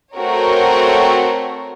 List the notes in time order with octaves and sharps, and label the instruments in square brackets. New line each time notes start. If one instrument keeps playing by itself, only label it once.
[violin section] A3 C4 F#4 A#4 C#5